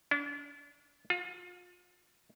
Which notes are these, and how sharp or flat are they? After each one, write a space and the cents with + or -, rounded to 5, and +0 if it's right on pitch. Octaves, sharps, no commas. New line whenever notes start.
D4 -40
F4 +35